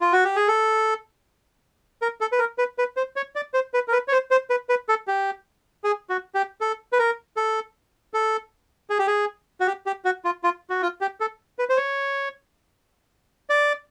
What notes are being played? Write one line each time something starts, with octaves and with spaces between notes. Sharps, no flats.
F4
F#4
G4
G#4
A4
A#4
A4
B4
A#4
B4
B4
C5
C#5
D5
C5
B4
A#4
B4
C#5
C5
C5
B4
B4
A4
G4
G#4
F#4
G4
A4
B4
A#4
A4
A4
G#4
G4
G#4
F#4
G4
G4
F#4
F4
F4
F#4
F4
G4
A4
B4
C5
C#5
D5